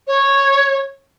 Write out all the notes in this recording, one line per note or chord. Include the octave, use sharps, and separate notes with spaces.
C#5